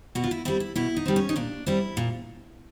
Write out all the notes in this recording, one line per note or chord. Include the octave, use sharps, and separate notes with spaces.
B2 F#4
F4
E4
G3 C4 E4
E4
B2 E4
D#4
G3 C4
C#4
D#4
A#2 D4
G3 C4 E4
A#2